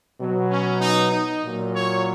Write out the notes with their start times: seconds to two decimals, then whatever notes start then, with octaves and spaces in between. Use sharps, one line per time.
0.20 B2 F#3
0.50 C#4
0.81 D#4
1.12 D#4
1.43 A#2 F#3
1.74 C#5